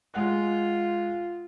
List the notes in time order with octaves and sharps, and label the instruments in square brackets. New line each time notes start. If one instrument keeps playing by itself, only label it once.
[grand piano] G#3 F#5 F#6 [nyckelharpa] F4